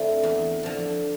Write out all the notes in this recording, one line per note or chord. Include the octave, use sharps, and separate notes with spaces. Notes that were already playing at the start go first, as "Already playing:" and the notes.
Already playing: D3 A3 C4 D4 E4
E2
D3 F3